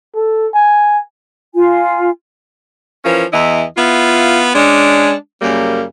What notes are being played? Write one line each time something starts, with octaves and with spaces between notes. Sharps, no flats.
A4
G#5
F4 G#5
E3 F3 C#4 A#4
E2 E3 E4 D#5
B3 E4 F4
G#3 C#4 D4
F#2 C#3 G3 A#3